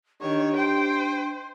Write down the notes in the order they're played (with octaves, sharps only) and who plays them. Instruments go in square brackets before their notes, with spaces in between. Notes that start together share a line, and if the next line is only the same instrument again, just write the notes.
[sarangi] D#3 [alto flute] D4 [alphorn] G4 [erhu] C#5
[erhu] C5 [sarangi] G5